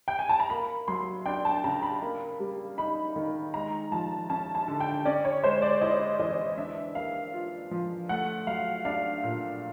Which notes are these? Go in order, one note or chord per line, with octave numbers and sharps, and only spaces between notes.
G5
G#5
A5
A#5
A#3 B5
F#3 C6
D4 G5
A5
C#3 A#5
B5
A#3
G3
D#4 B5
D#3
G#3 A#5
F3 A5
C#4 A5
A5
D3
G5
C#4 D5
C#5
G#3 C5
D5
E4 D#5
E3 D#5
D4 E5
A#3 F5
F4
F3
A3 F#5
F#3 F5
D4 F5
A#2